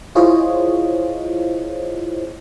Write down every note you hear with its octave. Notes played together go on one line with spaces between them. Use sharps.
E4 F4 G#4 C5 C#5 D#5